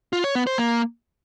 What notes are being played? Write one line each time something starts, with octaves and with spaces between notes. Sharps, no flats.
F4
C#5
B3
C5
A#3